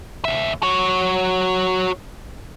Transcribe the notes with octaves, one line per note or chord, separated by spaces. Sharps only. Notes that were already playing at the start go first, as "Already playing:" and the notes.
D#2 E5
F#4 C#5